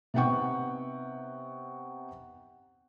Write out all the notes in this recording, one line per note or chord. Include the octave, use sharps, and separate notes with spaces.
C3 B3 D#4 F#5 G5 C#6